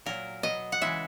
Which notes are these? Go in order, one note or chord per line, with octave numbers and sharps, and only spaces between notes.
A#2 F#3 A#4
B2 F#3 D#5
F#5
C#3 E3 G#3 E5